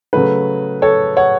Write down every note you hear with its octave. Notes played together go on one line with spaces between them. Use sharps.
C#3 F#3 A3 B4
A4 C#5
C#5 F#5